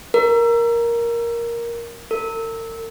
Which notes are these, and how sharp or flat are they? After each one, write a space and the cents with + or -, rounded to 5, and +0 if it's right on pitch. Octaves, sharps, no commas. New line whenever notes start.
A#4 +5
A#4 -45